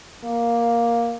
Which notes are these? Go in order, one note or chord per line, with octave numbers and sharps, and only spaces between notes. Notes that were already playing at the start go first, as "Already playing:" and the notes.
A#3